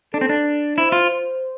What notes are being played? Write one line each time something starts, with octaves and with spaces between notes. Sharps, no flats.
D4 A4
C4
D4
E4 C5
F4